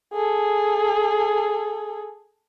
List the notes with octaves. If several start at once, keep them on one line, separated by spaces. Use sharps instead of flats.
G#4 A4